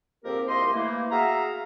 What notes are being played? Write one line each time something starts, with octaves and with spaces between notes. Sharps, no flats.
F2 G#2 A#3 C4 G4 A#4
C2 A#3 G4 D#5 C6
E3 A3 A#3
F#4 G#4 E5 F5 A#5